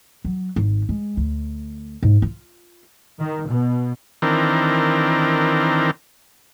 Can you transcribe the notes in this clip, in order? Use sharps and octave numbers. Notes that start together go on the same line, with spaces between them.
F#3
G#1
G#3
D2
G#2
F4
D#3
B2
D#3 E3 C4 D4 A#4